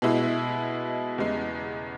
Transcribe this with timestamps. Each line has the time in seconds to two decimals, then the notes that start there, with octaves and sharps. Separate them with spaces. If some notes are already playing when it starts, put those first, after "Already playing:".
0.02 B2 G#3 E4
1.18 E2 C#3 G#3